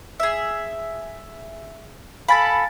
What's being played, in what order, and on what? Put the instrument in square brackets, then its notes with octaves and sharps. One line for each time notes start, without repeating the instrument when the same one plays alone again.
[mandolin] G#4 E5
[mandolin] A4 B5 [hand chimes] F5 G#5 A6